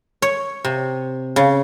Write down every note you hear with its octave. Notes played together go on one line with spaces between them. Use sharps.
C#5
C3
C#3